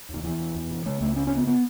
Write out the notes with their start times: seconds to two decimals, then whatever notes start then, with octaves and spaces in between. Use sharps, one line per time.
0.09 D#2
0.14 D#3
0.24 E2 E3
0.39 B2
0.55 E2
0.71 B2
0.85 C#3 G#3
1.01 C#2 A3
1.16 C#3 C#4
1.27 C#4
1.32 C#3 B3
1.47 B3